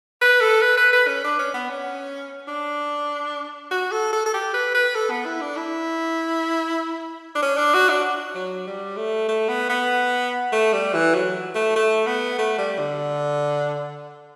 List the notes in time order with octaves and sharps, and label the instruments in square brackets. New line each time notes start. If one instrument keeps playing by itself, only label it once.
[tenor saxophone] B4
A4
B4
B4
B4
C#4
D4
C#4
B3
C#4
D4
F#4
A4
A4
A4
G4
B4
B4
A4
B3
E4
D4
E4
D4
C#4
D4
F#4
D4
F#3
G3
A3
A3
B3
B3
A3
G3
E3
F#3
A3
A3
B3
A3
G3
D3